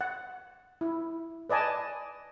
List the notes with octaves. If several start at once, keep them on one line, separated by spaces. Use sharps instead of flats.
F#5
E4
B4 D5 D#5 G#5 A5